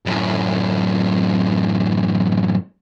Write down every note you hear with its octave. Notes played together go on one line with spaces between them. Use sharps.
F#2 A2